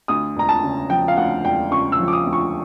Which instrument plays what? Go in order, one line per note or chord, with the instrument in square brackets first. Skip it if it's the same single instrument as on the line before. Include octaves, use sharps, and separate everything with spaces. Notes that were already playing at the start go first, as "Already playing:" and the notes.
[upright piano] D2 D#6
E1 A#5
A5
C#3
F3 G5
F5
D2 F#5
E1 G5
C#3 C#6
E6
F3
D6
D#6
D2
C#6